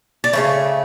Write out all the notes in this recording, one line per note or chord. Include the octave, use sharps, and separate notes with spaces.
D5
C#3 F3 A3 C#5